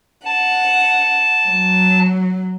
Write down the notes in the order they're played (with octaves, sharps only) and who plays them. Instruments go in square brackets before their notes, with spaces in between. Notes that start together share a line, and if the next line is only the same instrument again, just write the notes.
[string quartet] F#5 [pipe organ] A5
[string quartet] F#3